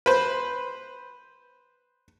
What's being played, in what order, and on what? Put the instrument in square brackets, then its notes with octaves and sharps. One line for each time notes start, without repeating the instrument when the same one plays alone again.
[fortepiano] B4 C5